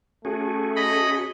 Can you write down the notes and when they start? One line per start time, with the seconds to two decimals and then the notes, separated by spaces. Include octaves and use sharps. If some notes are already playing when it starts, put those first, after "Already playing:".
0.25 A3 C#4 F#4 G#4
0.76 D#5 B5